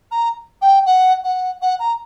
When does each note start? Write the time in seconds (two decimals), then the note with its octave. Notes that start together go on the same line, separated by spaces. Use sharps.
0.11 A#5
0.62 G5
0.86 F#5
1.24 F#5
1.62 F#5
1.79 A#5